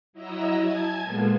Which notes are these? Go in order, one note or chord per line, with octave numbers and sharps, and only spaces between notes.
F#3 E4 D#5 A#5 E6
G#5 A5 G#6
A#2 G#3 B3 F4 A4